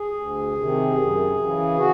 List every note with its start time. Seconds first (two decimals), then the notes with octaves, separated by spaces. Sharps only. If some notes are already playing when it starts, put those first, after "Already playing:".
Already playing: G#4
0.14 D2
0.55 C3 D#3
0.96 F#2
1.36 C#3 E3
1.77 F#4